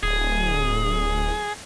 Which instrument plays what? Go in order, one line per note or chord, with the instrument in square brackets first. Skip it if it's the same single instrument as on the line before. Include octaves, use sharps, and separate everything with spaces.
[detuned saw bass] D1 [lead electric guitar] G#4